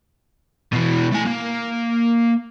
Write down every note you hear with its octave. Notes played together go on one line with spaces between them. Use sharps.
B2 E3
A3 G#5
A#3